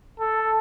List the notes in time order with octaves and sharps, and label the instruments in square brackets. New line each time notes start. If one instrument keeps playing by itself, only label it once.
[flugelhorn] A4